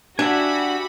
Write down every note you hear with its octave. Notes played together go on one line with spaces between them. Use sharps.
D4 F#4 G4 E5 F#5 G#5 B5